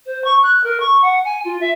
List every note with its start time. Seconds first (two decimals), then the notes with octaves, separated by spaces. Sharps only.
0.06 C5
0.24 C#6
0.43 F#6
0.64 A#4
0.80 C#6
1.02 F#5
1.25 G#5
1.45 F4
1.61 E5